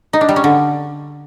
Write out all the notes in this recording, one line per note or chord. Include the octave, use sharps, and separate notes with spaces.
D#4
D4
G3
C#4
D3